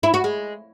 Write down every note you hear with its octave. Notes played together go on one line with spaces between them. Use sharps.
E4
F#4
G#3